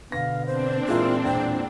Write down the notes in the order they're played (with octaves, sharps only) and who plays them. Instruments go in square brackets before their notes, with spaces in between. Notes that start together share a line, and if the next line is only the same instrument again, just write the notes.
[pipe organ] B2 D3 B3 [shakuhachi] F5 [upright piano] A#6
[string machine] C4 D4 [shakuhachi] C5
[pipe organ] A#2 E3 [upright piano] G#3 E4 A#4 [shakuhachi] F4
[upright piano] E1 [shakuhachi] G5